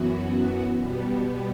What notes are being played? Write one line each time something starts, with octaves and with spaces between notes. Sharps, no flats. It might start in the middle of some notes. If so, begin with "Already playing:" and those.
Already playing: F#2 E3 B3 F#4
B2 G3 B3